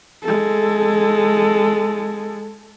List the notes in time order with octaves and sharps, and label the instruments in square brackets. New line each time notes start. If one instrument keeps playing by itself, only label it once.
[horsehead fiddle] G#3 A4